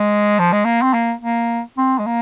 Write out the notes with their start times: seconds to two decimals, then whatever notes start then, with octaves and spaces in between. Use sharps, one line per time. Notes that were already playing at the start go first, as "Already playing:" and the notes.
Already playing: G#3
0.39 F3
0.53 G#3
0.65 A#3
0.82 C4
0.94 A#3
1.22 A#3
1.78 C4
1.99 G#3
2.06 A#3